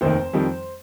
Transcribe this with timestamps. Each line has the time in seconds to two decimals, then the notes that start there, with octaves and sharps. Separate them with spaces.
0.01 F1 D#2 D#3 C5
0.33 F2 D#3 G3